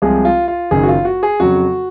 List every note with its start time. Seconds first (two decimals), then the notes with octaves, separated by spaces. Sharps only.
0.02 C2 C3 F3 G#3 G#4
0.25 F4
0.48 F4
0.71 F#1 F#2 D#3 G#4
0.83 F#4
0.88 F4
1.05 F#4
1.23 G#4
1.40 F2 C#3 F#3 F#4